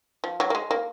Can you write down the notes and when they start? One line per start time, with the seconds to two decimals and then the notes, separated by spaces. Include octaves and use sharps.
0.24 F3
0.40 F#3
0.50 A#3
0.55 G#3
0.71 A#3